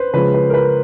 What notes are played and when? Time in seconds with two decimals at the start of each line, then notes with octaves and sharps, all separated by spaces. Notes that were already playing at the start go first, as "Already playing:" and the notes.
Already playing: B4 C5
0.14 C#3 F3 G#3 B4
0.34 B4
0.50 A#4
0.54 B4